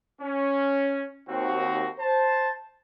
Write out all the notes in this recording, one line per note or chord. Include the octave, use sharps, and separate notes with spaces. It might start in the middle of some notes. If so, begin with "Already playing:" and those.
C#4
D#2 C4 F#4
C5 A5